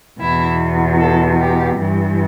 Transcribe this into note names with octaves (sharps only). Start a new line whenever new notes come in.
E2 B2 E4
A4
G4
G2 E3